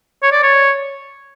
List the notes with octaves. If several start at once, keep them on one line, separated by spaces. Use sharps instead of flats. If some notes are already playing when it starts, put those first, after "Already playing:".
C#5
D5
C#5